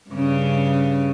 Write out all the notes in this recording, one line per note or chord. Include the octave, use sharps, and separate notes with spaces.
G2 C#3